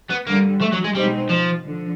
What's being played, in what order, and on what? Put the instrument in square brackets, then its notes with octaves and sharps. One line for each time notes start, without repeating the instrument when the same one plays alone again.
[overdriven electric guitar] B3
[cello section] G2 D3 G3 [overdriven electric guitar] A#3
[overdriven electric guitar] A3
F#3
G#3
[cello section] B2 G#3 C4 D#4 [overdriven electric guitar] G3
[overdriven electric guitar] F3
[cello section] D3 F3